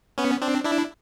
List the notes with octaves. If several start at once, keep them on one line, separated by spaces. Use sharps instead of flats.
B3 C#4
C4 D4
D4 E4